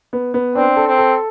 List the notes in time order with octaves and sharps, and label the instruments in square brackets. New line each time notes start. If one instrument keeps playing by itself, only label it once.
[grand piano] B3
B3
[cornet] C4 [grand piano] D4
[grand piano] A4
[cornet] C4
[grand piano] A4